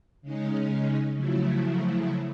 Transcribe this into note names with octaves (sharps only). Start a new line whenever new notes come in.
C#3 G#3 C#4 D#4
C#3 F3 F#3 A3 E4